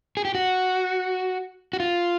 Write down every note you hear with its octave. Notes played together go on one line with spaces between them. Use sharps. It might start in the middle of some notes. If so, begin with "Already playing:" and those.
G#4
G4
F#4
F#4
F4